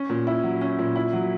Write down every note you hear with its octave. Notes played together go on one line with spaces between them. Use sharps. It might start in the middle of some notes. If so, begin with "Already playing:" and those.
Already playing: C#4
A#2
E4
F#3
C#4
A#2
E4
F#3